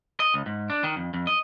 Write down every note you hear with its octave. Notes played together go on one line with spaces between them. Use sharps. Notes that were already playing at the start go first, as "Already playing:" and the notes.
D#5
C#2
G#2
D4
D#3
F2
F2
D#5